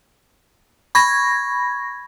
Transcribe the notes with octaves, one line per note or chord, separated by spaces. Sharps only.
B5 C#6 G#6 A#6